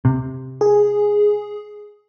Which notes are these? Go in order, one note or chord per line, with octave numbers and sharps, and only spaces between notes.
C3
G#4